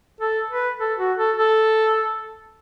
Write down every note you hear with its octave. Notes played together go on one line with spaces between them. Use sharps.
A4
B4
A4
F#4
A4
A4